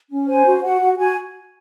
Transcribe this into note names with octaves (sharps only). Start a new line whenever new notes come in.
C#4
C5 G#5
F#4
F#4 F#5
F#4
F#4 G#5